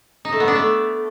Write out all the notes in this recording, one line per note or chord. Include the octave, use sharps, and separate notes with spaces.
D#4
A3
B3
D4
A3